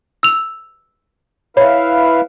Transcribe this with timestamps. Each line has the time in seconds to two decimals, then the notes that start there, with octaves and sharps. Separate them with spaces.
0.23 E6 F7
1.57 E4 B4 C#5 F5 B5